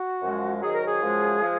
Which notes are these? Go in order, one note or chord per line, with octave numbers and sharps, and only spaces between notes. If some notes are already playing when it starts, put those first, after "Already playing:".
Already playing: F#4
F#2 F3 G#3
G#2 D#3 F#3 G#4
A#4
G#4
F#2 F3 G#3
F3 G#3